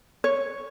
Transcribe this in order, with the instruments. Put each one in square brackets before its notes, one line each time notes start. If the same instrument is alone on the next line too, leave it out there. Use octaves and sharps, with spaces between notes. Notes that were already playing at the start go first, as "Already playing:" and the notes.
[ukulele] C#5